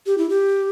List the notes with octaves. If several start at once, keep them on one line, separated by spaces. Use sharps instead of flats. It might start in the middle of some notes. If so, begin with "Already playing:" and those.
G4
E4
G4